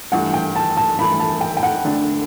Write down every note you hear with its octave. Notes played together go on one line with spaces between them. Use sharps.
G2 E3 A3 F#5
G5
A5
A5
G2 E3 A3 B5
A5
G5
G5
F#5
D3 A3 D4 A4